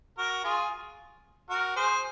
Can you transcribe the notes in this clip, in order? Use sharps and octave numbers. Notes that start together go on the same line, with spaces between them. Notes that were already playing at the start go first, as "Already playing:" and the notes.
F#4 A#4
F4 G#4
F#4 A#4
G#4 C5